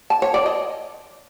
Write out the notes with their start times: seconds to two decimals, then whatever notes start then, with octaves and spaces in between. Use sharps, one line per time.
0.10 A5
0.22 C#5
0.34 D5
0.46 D#5